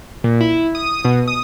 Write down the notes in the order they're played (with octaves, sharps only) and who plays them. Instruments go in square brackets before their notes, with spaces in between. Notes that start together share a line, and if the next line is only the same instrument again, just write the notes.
[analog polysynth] A#2
E4
D#6
B2
D#6